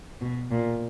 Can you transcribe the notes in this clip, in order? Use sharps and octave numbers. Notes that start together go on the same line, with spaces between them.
B2
A#2